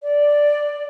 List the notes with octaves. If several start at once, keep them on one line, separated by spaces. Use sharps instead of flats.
D5